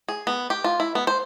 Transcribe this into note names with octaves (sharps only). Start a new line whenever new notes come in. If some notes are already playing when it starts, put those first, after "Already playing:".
G#4
B3
G4
F4
E4
B3
C5